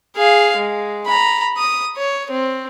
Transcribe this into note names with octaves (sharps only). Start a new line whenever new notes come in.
G#4 F5
G#3
A#5 B5
D#6
C#5
C4